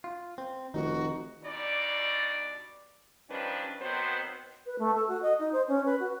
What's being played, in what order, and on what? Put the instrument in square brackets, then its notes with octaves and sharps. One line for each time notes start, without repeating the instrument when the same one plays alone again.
[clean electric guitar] F4
C4
[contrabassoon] F1 [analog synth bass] D#3 [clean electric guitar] D#4 [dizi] F#4
[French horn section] G2 B2 D#4 D5
D#3 F3 G3 C#4 D4 B4
D#3 F#3 B3 C4 B4 C5
[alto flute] B4
A3
A4
F#4
D#5
D#4
C5
C#4
B4
F#4